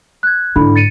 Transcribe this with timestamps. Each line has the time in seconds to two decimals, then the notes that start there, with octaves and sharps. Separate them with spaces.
0.23 F#6 G#6
0.56 G#2 D3 E4 B5
0.76 A6 C#7 D#7